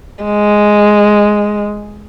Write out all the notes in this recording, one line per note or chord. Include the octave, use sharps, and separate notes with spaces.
G#3